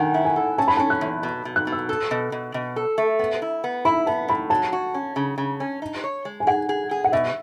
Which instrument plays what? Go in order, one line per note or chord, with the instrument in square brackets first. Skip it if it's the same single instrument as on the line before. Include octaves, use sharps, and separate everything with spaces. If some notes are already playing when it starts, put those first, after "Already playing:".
Already playing: [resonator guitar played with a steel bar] D#3 [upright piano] F#5 G#5
[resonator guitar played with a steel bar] E4
[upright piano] G#5
[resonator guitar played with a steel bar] A4
[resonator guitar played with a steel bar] C#4 [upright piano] A5
[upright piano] B5
[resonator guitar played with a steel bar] C#4 [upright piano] A5
[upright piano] F#6
[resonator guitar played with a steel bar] E2
B2
B2
[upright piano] F#6
[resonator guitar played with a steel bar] B2
[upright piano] E6
[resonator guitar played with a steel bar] A4
B2
B2
B2
A4
A3
B3
E4
B3
[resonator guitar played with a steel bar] E4 [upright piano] B5
[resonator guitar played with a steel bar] B3 [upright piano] A5
[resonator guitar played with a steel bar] A2 [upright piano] B5
[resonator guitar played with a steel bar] F#3 [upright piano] A5
[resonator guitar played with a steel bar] F#4
C#4
C#3
C#3
C#4
D#4
C#5
G#3
[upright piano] G#5
[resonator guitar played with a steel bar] G#4 [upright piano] F#5
[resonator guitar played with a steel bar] G#4
G#4
[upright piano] F#5
[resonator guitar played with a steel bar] B2 [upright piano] E5